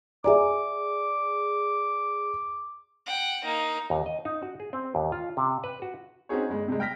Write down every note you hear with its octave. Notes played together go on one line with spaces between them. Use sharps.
G#4 D5 E5 G#5 A#5 D6
F#5 G5
A#3 D#4
D#2
D#5
D#4
F#4
G#4
C4
D#2
F4
C3
B4
F#4
C4 C#4 D#4 F#4 G#4 C#5
G1 G#3
C3 G3 G#3
G5 F6 A#6 B6